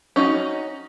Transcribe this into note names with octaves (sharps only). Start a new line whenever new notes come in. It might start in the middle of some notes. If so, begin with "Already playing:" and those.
C#4 D#4 F4 F#4